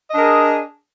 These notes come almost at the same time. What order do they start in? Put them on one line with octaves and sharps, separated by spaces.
D#5 D4 A#4 G#4